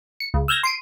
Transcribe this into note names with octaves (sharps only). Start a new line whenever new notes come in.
C#7
C#2
E6 F6 G6 G#6 A#6
C6 D7 D#7